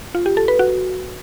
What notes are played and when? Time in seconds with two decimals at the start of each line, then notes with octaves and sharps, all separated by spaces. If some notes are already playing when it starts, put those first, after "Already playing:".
0.15 F4
0.26 G4
0.37 A4
0.48 B4
0.59 F#4